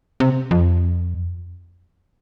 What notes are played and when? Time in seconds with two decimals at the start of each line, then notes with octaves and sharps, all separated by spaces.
0.20 C3
0.51 F2